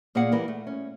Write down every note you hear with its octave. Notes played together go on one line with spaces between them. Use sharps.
A#2 A#3 G#4 D5 F5 F#5
E3 G3 A#4
A3
C#4